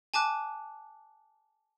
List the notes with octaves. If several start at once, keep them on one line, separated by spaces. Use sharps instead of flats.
G#5 A5 D6 F#6